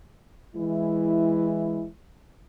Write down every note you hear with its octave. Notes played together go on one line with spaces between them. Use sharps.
E3 G#3 E4